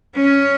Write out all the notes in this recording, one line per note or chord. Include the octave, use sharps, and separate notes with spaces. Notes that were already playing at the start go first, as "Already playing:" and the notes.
C#4